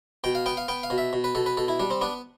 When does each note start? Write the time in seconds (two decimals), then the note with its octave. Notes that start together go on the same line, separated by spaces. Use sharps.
0.24 B2 G5
0.35 F5
0.46 B3 G5
0.57 F5
0.68 B3 G5
0.83 F5
0.90 B2
0.98 E5
1.13 B2
1.24 B4
1.35 B2 A4
1.46 B4
1.57 B2 A4
1.68 E4
1.80 G3 D4
1.90 C4
2.01 B3 D4